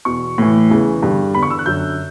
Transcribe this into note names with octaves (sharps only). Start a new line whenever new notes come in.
E2 B2 C#6
A2 E3
E2 C#3 E3
G2 D3
E2 D3 B5
C#6
E6
F#6
F#2 D3 G6